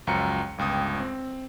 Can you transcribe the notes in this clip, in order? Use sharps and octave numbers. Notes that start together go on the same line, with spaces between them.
C#2 F#2 F3 A#5 C#7
G1 C#2 G5 D#6
C4